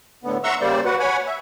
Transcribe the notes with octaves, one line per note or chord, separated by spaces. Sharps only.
A2 D3 B3
E5 F#5 A#5 C6 C#6 E6
C#3 G3 A#3 C5 D5
F#4 B4 F#5
C#5 F#5 G#5 B5
E5